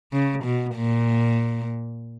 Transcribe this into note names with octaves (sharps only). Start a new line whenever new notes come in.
C#3
B2
A#2